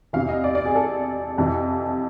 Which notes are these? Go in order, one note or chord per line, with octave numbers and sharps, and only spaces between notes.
E2 C3 E3 F5
D#5
D5
D5
G#4
A4
F2 C3 E3